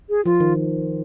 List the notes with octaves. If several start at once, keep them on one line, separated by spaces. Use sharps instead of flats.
G#4
F3 F4
D#3